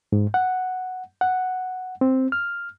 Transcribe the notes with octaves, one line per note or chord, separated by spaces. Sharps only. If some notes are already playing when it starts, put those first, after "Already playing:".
G#2
F#5
F#5
C4
F6